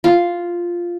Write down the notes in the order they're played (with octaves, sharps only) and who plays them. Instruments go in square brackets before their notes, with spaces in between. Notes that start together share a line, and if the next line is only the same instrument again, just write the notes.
[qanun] F4